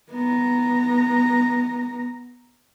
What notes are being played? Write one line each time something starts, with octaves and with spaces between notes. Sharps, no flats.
B3 A#5